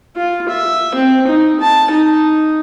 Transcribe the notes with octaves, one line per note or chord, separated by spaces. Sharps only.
F4
E5
C4
D#4
A5
D#4